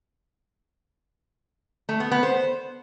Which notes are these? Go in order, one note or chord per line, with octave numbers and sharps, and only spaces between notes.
A3
B3
B3
C5